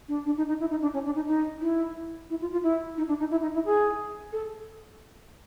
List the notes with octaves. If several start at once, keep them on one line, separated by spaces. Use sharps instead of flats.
D4
D4
D#4
D#4
E4
D#4
D4
C#4
D4
D#4
D#4
E4
E4
F4
F4
E4
D#4
D4
D#4
E4
D#4
E4
G#4
A4